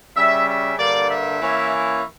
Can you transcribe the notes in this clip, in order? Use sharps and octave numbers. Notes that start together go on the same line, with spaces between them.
C#3 G3 C#4 E5
E5
G2 D3 G3 A#3 D5
E5
E3 A#3 C#4 E4